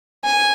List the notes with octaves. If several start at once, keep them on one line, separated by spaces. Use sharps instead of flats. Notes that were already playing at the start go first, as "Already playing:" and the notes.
G#5